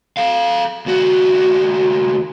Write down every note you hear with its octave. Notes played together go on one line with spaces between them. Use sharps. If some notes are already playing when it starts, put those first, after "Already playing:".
A4 F5
D#2 F#4